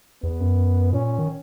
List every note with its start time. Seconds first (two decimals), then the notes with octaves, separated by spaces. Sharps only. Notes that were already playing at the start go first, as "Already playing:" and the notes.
0.23 E2 B3
0.40 F#2
0.93 A#2 C#4
1.19 D#3